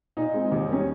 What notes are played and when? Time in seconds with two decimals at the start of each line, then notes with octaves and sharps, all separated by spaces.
0.17 A#2 D#4
0.34 G#3 C4
0.51 D#2
0.69 D#3 G3 C#4